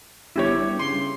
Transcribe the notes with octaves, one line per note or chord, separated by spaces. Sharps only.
G1 E4 G4 C#5
G2
C#3 C6